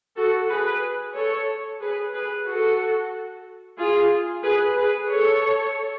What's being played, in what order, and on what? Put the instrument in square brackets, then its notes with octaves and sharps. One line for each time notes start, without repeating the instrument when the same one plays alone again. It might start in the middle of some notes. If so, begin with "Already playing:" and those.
[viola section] F#4 A4
G#4 B4
A4 C#5
G#4 B4
G#4 B4
F#4 A4
F4 G#4
G#4 B4
G#4 B4
A4 C#5